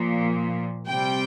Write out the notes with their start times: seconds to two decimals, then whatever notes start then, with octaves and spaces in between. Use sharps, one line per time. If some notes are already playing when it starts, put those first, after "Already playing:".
Already playing: A#2 F3
0.87 C3 G3 G5